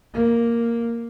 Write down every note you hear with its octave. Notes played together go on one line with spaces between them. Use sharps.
A#3